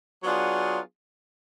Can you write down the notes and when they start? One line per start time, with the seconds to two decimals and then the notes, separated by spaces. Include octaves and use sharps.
0.24 F#3 B3 D4 F4 G#4